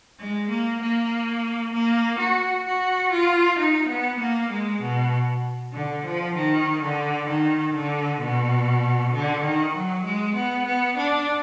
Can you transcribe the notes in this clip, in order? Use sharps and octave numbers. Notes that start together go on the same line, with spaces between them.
G#3
A#3
A#3
A#3
F#4
F#4
F4
D#4
B3
A#3
G#3
B2
D3
F3
D#3
D3
D#3
D3
B2
D3
D#3
F#3
G#3
B3
B3
D4